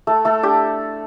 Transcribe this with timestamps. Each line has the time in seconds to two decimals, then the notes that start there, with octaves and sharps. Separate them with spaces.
0.07 A3 A4
0.25 A3 A4
0.43 D4 G4